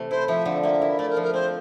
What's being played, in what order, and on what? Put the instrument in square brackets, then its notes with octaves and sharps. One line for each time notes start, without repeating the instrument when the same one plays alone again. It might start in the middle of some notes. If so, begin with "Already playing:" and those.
Already playing: [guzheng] C3 E3 A3
[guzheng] E4 [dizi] C5
[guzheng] F3 [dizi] E5
[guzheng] D3
[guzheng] A#3 [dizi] E5
[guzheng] E4
[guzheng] A3 [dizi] D5
[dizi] A#4
[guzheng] F3
[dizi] A#4
[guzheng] C4 [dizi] C5